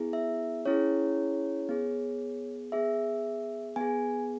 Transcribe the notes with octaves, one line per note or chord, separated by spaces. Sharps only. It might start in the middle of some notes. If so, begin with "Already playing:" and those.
Already playing: B3 E4 G#4
E5
C#4 E4 G#4 C#5
B3 G#4
B3 G#4 E5
B3 G#4 G#5